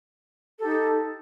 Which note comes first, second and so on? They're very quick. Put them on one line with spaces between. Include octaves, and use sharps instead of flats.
A4 G4 D#4